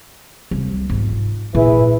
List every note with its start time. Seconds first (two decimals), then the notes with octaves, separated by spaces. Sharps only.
0.51 C2
0.89 G#2 F4
1.55 A#2 E4 G#4 B4